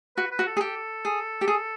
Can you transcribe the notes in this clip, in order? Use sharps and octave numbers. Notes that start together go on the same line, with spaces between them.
F#4 B4
B4
F#4
A4
G#4
G4 A4
G#4
G4
G#4